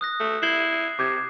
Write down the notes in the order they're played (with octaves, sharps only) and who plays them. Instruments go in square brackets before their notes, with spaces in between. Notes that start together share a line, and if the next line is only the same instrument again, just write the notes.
[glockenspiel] D#6 F#6 A#6
[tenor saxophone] A3
[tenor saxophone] E4 [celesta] G6 F#7 G7 [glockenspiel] G#6 C7
[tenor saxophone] C3 [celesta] D6 G6 G#6